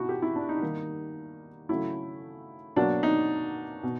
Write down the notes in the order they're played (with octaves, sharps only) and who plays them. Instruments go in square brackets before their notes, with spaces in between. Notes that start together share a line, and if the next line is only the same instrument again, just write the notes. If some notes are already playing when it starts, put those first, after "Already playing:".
Already playing: [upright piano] B2 D#4 E4 F#4
G4
E4
D4
D#4
D#3 G3 A#3
C#3 F#3 A3 E4
B2 F#3 A#3 D4
D#4
B2